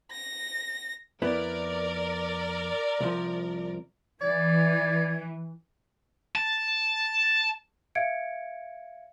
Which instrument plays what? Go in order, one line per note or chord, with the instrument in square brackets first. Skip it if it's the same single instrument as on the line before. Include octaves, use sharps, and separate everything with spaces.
[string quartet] A#6
[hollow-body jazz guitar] F2 B3 E4 [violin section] A#4 D5
[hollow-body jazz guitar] C2 F3
[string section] E3 [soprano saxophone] D5 [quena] G#6
[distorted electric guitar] A5
[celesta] E5 F5 G#6 C#7 D7